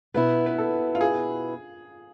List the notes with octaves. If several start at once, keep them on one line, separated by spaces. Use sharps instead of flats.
B2 B3 E4 B4
B4
A4
F4
G#4